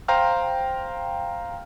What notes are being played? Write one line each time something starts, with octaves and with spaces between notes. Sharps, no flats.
C5 F5 G5 A#5 C6 F6